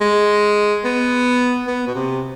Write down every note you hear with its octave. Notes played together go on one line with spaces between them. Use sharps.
G#3
B3
B3
B2
C3